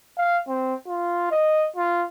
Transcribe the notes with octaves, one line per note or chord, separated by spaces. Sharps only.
F5
C4
F4
D#5
F4